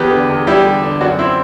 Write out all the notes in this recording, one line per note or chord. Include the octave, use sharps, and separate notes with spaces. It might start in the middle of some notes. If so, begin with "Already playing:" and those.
Already playing: E2 G4 B4
D3
E2
G3 E4 G4
D3
D3
F#2 D4 F#4
C4 E4